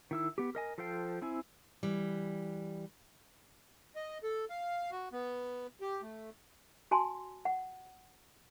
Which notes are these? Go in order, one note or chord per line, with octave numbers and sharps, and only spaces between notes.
D#3 E4 E6
B3 G4
A#4 D#5 G#5
F3 A4 C5 F5 G5
C4 E4 G#5
E3 G3
D#5
A4
F5
F#4
B3
G4
A3
F#4 G#5 A5 C6
F#5